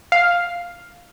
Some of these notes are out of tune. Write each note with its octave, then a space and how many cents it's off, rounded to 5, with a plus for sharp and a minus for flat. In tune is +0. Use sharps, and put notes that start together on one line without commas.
F5 +5